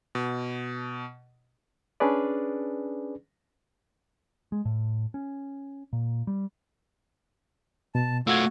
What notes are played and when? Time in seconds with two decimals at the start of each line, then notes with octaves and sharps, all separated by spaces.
0.15 B2
2.00 C#4 D4 G#4 B4 D5
4.52 G#3
4.65 A2
5.14 C#4
5.93 A#2
6.27 G3
7.95 B2 A5
8.27 A3 F4 F#4 E6 G#6